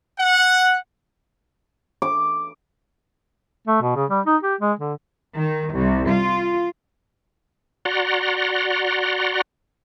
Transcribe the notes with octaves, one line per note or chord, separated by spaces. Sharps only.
F#5
D6
A3
B2
C#3
G3
D#4
G4
G#3
D3
D#3
C2
F4
F#4 D5 F#5 A#5 C6